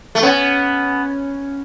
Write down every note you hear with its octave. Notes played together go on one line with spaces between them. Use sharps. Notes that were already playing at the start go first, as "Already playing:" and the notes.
A3
B3 C#4